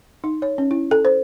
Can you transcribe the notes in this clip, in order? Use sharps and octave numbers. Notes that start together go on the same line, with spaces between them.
D#4
C#5
C#4
E4
A4
C5